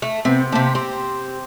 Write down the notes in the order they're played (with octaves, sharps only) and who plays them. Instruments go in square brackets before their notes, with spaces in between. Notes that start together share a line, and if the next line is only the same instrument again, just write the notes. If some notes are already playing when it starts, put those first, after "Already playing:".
[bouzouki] A3
[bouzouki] C3 [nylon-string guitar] B3 C4
[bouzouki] C3 G4 [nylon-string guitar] A#3 A5
[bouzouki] C4 [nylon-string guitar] G4